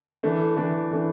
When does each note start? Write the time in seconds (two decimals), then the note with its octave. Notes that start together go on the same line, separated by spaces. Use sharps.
0.23 E3 A3 D4
0.57 E3 A3 D4
0.91 E3 A3 D4